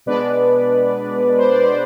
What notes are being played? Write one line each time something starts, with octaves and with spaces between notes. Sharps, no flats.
B2 G#3 B3 D4 B4 D5
C5
D5
C5
D5